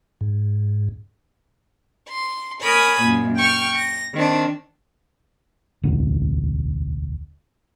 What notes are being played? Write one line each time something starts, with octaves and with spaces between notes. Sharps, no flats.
G#2
C6
A#4 C#5 G#5 B5 D#6
F#2 A#2
G5 C#6 F6
A#6
D#3 C4 D4
E1 A1 D2